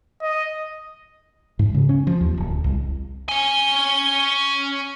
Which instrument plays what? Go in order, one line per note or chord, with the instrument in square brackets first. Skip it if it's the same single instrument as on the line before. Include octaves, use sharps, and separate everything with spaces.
[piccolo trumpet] D#5
[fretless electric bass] G#2
C#3
C#4
F3
D#2
D1
C2
[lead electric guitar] C#4 G#5 [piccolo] G7